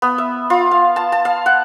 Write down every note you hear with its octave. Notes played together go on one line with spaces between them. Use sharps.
B3
E5
F4
F5
A5
A5
F5
F#5